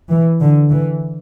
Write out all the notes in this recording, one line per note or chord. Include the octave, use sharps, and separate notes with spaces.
E3
D3
E3